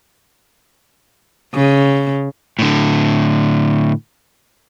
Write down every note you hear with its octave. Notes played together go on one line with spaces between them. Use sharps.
C#3
A2 D3